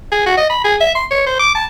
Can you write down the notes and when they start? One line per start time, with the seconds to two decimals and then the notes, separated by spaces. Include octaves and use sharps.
0.12 G#4
0.26 F#4
0.37 D#5
0.50 B5
0.64 G#4
0.81 E5
0.95 C6
1.11 C#5
1.26 C5
1.39 D6
1.55 A5